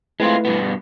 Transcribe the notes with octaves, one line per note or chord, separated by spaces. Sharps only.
G#3 A3 C4 E4 F4 B4
G2 B2 B3